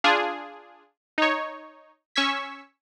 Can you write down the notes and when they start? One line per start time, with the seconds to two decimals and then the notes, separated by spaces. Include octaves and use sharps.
0.04 D4 F4 G#4
1.18 D#4 C#5
2.16 C#4 C#6 E6 G#6 B6